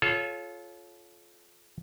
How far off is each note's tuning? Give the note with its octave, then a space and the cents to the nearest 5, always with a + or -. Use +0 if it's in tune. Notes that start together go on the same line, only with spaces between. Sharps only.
F4 +0 A4 -30 C#5 +0